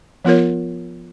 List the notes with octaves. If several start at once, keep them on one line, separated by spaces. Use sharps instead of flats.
F3 B3 F4 A#4 C#5